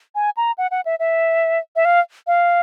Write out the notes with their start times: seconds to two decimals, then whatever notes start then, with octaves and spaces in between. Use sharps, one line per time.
0.15 G#5
0.37 A#5
0.58 F#5
0.71 F#5
0.86 E5
0.99 E5
1.76 E5
1.85 F5
2.27 F5